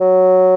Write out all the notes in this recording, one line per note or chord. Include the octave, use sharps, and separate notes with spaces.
F#3